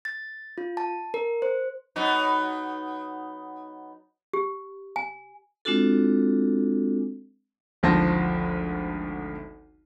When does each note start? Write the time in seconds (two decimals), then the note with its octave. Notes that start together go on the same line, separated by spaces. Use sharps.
0.05 A6
0.58 F4
0.77 A5
1.14 A#4
1.42 C5
1.96 F#3 B3 D#4
4.33 G4
4.96 G#5
5.65 G#3 C4 D4 F4 F#4 A4
7.83 G#1 D2 F3 A5 C6 A#6